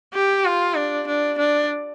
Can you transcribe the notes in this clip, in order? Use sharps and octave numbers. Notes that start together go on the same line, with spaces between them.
G4
F4
D4
D4
D4